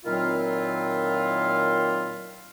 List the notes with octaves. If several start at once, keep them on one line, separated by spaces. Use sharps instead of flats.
A#2 D#3 F#3 C4 E4 F4